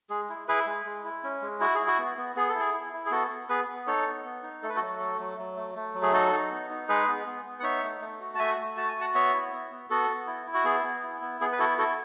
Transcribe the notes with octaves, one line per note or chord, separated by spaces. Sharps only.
G#3 G#4
E4
E4 G#4 B4
G#3
G#3
E4
C#4
G#3
E4 F#4
E4 G#4
F#4
B3
B3
B3 G#4
A4
E4
G#4
E4
E4
G#4
B3 F#4 A4
B3
B3 G#4 B4
B3
D#4 A4 C#5
B3
B3
D#4
A3 A4
B4
F#4 A4
F#3
A3
F#3
F#3
A3
A3
F#3
G#4
D#4 F#4 A4
D#4
B3
D#4
G#3 G#4 B4
B3
B3
B3
F#5
D#4 C#5 E5
A3
A3
F#4
A5
A3 E5 G#5
A3
F#4 A5
G#5
F#4 F#5 A5
B3 C#5 E5
E4
B3
B3
B3 F#4 A4
B3
E4
E4
F#4
B3 G#4
B3
E4
B3
B3 G#4
B4
E4 F#4 A4
E4 F#4 A4